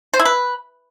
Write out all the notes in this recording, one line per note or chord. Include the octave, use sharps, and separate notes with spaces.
C5
E4
B4